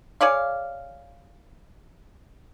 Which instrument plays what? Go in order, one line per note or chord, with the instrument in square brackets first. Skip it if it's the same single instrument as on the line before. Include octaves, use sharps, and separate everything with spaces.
[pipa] G#4 C#5 D5 F5